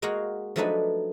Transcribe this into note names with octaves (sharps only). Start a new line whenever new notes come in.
G#3 A#3 F#4 G#4 F5 F#5
F3 F#3 A3 D4 D#4 B4